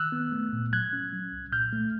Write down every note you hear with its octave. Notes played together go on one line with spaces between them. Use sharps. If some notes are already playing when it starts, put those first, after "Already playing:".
Already playing: D#3 E6 F#6
B3
A3
A#2
F#3 F#6 G#6
C#4
F#3
C2
A#2 F6 G6
A3